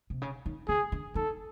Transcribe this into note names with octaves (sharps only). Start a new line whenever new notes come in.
C3
C#3
D#3
C#3 G#4
D3
D#3 A4